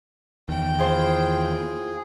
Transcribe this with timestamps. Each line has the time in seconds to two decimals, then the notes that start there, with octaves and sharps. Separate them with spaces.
0.49 E2 D#3 G5
0.79 E4 F4 G#4 C5